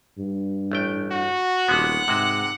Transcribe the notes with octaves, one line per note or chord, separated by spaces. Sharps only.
G2
A1 A3 G5
F#4
D#1 D3 G#3 B3 F#5
G#2 C3 G#3 F#4